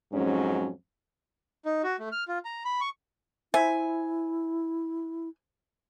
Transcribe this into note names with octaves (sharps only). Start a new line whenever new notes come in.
F2 G#2 F#3 C#4
D#4
F#4
A3
F6
F4
A#5
B5
C#6
E4 C5 E5 G#5